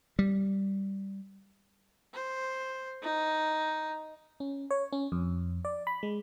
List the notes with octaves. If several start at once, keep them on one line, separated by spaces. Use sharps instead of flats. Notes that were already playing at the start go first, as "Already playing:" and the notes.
G3
C5
D#4
C#4
C#5
C#4
F2
D5
B5
G#3